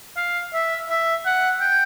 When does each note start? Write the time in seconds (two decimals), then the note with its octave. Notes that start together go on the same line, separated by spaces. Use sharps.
0.16 F5
0.54 E5
0.90 E5
1.25 F#5
1.61 G5